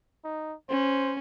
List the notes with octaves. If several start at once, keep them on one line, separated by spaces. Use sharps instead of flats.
D#4
C#4 C5